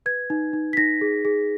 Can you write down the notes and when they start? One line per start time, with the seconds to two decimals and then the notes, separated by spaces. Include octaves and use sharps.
0.06 B4 G#6
0.30 D#4
0.53 D#4
0.73 B6
0.77 D#4 A#6
1.01 G#4
1.25 G#4